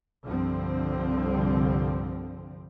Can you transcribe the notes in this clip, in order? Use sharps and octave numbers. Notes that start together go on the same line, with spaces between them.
C2 G2 D3 F3 G3 C4